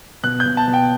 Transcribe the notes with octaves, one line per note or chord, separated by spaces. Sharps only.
B2 F#6
G6
B2
A5
B2
G5